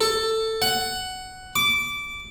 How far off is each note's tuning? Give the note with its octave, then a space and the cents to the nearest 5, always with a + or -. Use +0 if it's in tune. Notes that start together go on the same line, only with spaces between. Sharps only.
A4 +15
F#5 +10
D6 -15